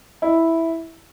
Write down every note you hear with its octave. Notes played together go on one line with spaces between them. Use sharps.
E4